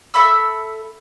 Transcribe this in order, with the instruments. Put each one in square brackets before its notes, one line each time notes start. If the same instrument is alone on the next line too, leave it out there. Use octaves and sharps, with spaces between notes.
[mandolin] A4 E5 B5 E6